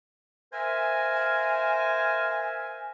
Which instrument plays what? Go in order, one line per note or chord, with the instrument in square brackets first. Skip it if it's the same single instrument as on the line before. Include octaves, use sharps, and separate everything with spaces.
[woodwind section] A#4 C5 E5 F5 G#5